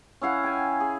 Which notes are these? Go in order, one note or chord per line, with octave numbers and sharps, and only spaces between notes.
C#4 E4 F5 F#5
G5 G#5
G#4